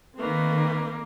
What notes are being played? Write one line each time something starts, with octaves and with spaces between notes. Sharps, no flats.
D#3 A3 A#3 C4 B4